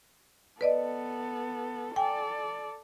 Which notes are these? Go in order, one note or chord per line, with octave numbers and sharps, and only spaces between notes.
B3 A4 B4 D5 D#5
A4 D5 G5 G#5